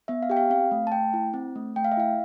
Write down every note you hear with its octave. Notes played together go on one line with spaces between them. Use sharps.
B3 E5
F5
G4 G5
F5
C4 F5
A3
A5
A3 G5
E4
C4
A3
A3 G5
F5
E5
E4 F5